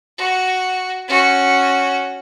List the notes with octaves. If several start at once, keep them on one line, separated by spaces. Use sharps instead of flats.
F#4
C#4 F#4